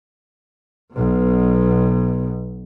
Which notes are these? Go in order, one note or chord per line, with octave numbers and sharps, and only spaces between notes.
B1 B2